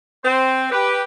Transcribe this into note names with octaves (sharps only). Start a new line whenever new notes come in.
C4 C5
G4 B4